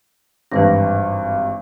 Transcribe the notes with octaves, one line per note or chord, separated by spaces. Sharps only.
G#1 G2 E3 B4 A#6